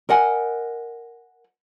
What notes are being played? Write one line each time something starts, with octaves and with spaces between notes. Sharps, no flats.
A#4 D#5 F#5 G#5